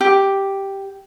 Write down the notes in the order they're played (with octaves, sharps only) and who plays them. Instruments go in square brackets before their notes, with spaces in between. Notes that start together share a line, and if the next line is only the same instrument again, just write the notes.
[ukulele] G4